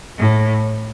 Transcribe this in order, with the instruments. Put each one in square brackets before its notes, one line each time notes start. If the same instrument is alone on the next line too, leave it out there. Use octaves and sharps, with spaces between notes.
[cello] A2